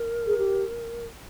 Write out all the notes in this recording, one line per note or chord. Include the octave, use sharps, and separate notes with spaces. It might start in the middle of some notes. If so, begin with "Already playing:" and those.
Already playing: A#4
G#4
G4